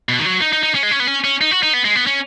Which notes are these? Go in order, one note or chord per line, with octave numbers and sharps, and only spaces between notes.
B2
D#3
F#3
D#4
D#4
D#4
C#4
G#3
C#4
B3
C#4
C#4
D#4
F#4
D#4
B3
G#3
B3
C#4